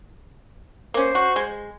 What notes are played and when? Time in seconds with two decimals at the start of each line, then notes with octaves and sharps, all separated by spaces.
0.94 A#3 C#4 C5
1.15 F#4
1.36 G#3